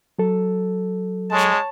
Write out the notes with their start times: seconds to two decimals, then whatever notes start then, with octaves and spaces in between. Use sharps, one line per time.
0.19 F#3 A4
1.31 G#3 C#5 A5